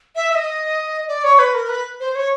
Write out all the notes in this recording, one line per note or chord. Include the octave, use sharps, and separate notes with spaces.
E5
E5
D#5
D5
C#5
B4
A#4
B4
C5
C#5